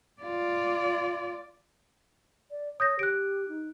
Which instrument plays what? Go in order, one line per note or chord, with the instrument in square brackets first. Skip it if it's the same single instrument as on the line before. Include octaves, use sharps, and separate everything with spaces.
[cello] F4 D5
[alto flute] D5
[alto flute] C#5 [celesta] D#6 G6 A#6
[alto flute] G4 [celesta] F#6 D7
[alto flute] D#4